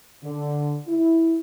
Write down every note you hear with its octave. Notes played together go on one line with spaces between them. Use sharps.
D3
E4